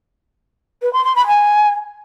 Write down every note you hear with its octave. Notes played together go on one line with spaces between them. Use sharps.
B4
C6
C6
B5
G#5